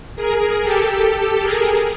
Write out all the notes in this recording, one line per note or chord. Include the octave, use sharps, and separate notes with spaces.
G#4 A#4
G4 A4
G4 A4
G#4 A#4